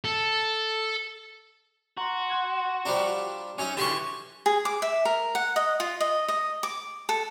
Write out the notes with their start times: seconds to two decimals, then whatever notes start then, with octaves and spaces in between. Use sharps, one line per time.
0.05 A4
1.97 F#4 A#5 C6
2.30 C6 F#6 G#6
2.86 F3 G3 D4 A#5
3.58 F#3 C#4 D#4
3.77 D3 E3 G4 C6 C#6
4.46 G#4
4.65 D6
4.82 E5
5.05 A#4
5.35 F#5
5.56 D#5
5.80 F4
6.01 D#5
6.28 D#5
6.63 D6
7.09 A4